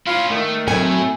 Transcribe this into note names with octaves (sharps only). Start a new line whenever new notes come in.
C#4 E4 F4
D#3 A3
F#3 A3 C4 E4 A4 G#5